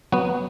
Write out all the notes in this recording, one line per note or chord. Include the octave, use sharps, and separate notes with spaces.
F#3 B3 F#4